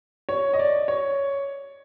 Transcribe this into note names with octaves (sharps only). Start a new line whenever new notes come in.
C#5
D#5
D5
C#5